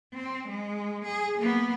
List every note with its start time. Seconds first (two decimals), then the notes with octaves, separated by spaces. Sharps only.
0.13 C4
0.47 G#3
1.05 G#4
1.38 A#3 B3